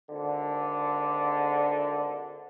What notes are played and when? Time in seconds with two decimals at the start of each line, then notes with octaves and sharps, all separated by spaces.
0.10 G#1 D3